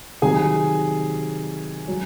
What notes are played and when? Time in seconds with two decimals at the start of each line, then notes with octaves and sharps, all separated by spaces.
0.22 C3 D#3 F#3 G#4 G#5
1.88 F#3